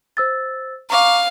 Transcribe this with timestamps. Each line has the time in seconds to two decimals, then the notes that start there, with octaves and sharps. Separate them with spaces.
0.17 C5 E6 A6
0.90 F5 A#5 C#6 D6